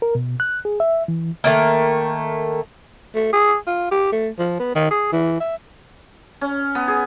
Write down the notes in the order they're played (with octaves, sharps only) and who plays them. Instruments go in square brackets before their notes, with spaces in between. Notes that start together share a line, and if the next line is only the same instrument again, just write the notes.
[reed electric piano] A#4
B2
F#6
G#4
E5
E3
[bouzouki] D#3 A3 A#3
[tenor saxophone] A3
G#4
F4
G4
A3
F3
B3
D#3
G#4
E3
E5
[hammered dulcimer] C#4
B3
G#4